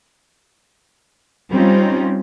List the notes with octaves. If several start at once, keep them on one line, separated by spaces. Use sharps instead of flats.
G3 C4 C#4 D#4 F4